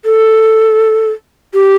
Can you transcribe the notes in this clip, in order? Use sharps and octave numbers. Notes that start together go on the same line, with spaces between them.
A4
G4